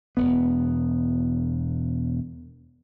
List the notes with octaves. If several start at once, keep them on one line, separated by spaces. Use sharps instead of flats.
E1 B3